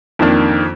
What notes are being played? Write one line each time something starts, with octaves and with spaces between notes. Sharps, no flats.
F2 D#3 A#3 D4